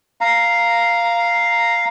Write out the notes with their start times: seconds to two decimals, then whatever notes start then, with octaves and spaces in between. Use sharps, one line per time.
0.21 F5 A#5